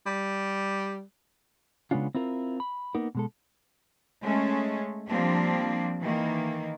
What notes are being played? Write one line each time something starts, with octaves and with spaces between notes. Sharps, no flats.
G3
C#3 G#3 B3 C#4 D4 F4
C4 E4 F4 A#4
B5
A#3 B3 D#4 A#4
B2 G#3 A4
G#3 A3 C#4
F3 G3 A#3 C4 D4
D#3 E3 A#3